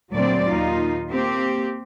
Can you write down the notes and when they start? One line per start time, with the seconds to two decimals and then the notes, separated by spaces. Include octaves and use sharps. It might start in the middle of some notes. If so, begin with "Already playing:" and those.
0.12 D2 A#2 F#3 A3 C4 D5
0.47 D#2 A#2 D#4 F4
1.09 A#3 C4 G4